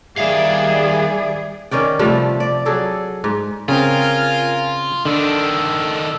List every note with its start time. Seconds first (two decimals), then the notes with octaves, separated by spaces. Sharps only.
0.18 D#3 G3 G#4 D5 E5 F5
1.71 D#3 C#4 D5 G5
1.99 C3 F3 G3 A3
2.40 D5
2.65 F#3 G#4 A4 D5
3.24 G#2
3.69 C#3 C4 F4 A#4 G#5 F6
5.05 D3 D#3 D4 A4